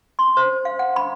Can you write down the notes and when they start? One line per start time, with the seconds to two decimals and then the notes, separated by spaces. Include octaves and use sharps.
0.19 C6
0.37 C5
0.65 F5
0.79 F#5
0.96 B5